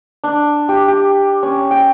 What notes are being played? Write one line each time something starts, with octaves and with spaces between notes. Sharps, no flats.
D4
G4
G4
C#4
G5